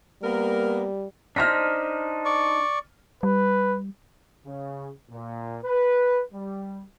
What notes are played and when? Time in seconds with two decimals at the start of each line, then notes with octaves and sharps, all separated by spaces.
0.22 G3 A#3 B3 A#4
1.36 D4 D#4 C5 F6 A#6 B6
2.25 D5 C#6
3.23 G3 B4
4.45 C#3
5.11 A#2
5.65 B4
6.33 G3